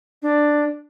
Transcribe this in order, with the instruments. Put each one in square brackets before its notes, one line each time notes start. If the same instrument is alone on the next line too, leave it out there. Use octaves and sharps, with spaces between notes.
[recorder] D4